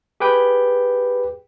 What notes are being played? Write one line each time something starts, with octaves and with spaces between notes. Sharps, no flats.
G4 G#4 B4 G5